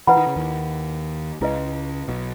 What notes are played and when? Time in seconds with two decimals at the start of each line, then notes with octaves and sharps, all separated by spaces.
0.07 E3 E4 B4 F#5 B5
0.17 D#3
0.27 C#3
0.36 D#2 D#3
1.41 C#2 C#3 E4 B4 D#5
2.08 B1 B2